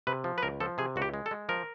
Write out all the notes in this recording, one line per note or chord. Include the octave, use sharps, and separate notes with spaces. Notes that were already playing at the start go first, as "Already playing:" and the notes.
C3 B4
F3
B4
C#2 A#4
F3 A4
C3 G#4
C#2 F#4
G4
G#3
A4
G#3
F3 A#4